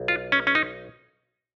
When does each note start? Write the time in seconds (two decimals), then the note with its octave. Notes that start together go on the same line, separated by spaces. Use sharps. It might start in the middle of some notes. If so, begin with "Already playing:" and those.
Already playing: B1
0.08 F4
0.32 C#4
0.47 C#4
0.55 D#4